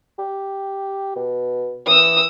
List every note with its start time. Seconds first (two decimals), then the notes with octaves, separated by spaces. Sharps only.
0.19 G4
1.16 B2
1.87 E3 D#6 E6